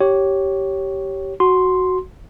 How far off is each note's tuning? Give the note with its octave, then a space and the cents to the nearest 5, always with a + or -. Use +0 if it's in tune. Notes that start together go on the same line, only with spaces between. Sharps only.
G4 -15 C#5 +0
F#4 +0 C6 +0